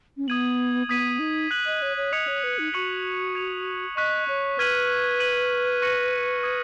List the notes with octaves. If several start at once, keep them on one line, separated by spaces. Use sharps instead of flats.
C#4
B3 D#6 G#6 D#7 F#7
B3 D#6 G#6 B6 D#7
D#4
F#6 B6 F#7
D#5
C#5
C#5
D#5 D#6 G#6 C#7 F7
C#5
B4
D#4
F#4 C#6 F#6 C#7 F#7
G#6 C#7 F7
D#5 C#6 F#6 B6
C#5
B4 F6 G#6 B6 D#7 F#7
G#6 D#7 F#7
C#6 F#6 A#6 C#7 F#7
D#6 G#6 C#7